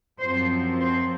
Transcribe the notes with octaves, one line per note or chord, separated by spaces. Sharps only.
F#2 F3 C4 C5
C5